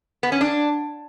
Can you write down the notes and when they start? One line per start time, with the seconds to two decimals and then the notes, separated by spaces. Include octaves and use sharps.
0.23 B3
0.32 C#4
0.41 D4